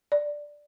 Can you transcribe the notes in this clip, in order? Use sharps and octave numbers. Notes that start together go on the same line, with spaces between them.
D5